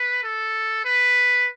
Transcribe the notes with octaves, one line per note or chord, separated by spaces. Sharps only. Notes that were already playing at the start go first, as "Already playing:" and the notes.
Already playing: B4
A4
B4